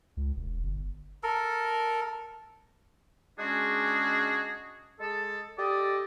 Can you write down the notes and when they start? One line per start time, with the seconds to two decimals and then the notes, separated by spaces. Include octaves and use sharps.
0.17 C#2
0.37 E1
0.63 G1
1.23 A4 A#4
3.39 G#3 C#4 D4 F#4 G#4
5.00 G#3 G#4 A4
5.58 G4 A4 D5 D#5